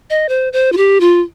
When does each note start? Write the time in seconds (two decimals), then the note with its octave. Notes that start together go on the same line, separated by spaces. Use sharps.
0.10 D#5
0.29 C5
0.53 C5
0.72 F4
0.77 G4
1.00 F4